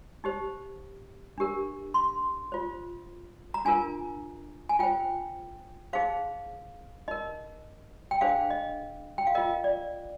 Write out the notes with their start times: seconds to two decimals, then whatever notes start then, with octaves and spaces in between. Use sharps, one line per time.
0.24 D#4 G4 C5
1.38 D4 G4 A#4
1.94 C6
2.52 F4 C5
3.54 A#5
3.65 D4 F4 A#4 G#5
4.69 G#5
4.79 F4 C5 G5
5.93 D#4 G#4 C5 F5
7.08 D#4 A#4 D#5
8.11 G5
8.21 D4 G#4 C5 F5
8.50 D#5
9.18 G5
9.27 F5
9.35 F4 A#4 D#5
9.64 D5